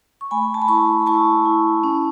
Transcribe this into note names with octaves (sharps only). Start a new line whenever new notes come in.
C#6
A3 G#5 B5
A5
B5
E4 A5 C#6
E4 A5 C#6
E4
C#4